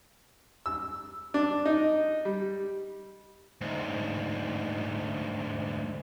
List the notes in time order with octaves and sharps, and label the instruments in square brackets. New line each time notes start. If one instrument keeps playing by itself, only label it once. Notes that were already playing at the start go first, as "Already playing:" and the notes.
[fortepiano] E6
D4
D#4
G3
[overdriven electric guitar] D2 G#2